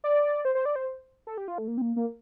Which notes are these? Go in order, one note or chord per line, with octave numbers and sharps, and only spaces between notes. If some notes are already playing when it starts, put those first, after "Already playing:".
D5
C5
C5
D5
C5
A4
G4
F4
A3
A#3
C4
A#3
A#3